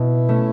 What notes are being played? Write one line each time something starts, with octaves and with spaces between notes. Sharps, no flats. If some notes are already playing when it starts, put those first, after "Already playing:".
Already playing: B2 E4
A3 C#4